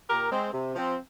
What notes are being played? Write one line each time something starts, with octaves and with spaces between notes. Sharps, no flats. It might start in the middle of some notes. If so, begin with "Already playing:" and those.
A#2 G4 A#4
G#3 C4
C3
F3 C4